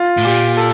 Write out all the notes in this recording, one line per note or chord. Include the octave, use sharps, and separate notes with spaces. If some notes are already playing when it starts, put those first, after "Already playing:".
Already playing: F4
A2
A#2 G4
A4